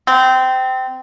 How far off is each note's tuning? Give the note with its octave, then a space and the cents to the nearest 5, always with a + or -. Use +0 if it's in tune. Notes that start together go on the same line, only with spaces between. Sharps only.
C4 -20